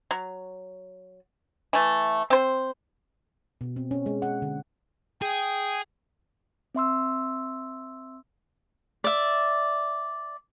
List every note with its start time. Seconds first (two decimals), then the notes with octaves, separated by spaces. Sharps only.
0.11 F#3
1.73 E3 A3
2.30 C4 C5
3.61 B2
3.76 C4
3.91 C#4
4.06 G#3
4.22 F#5
4.42 D3
5.22 G#4 G5
6.75 C4 E5 C6 E6
9.04 D5 E5